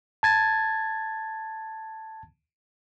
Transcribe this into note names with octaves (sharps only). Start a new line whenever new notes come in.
A5 G#6 A6